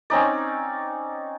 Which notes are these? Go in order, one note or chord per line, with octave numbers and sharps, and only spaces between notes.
C4 C#4 D#4 D5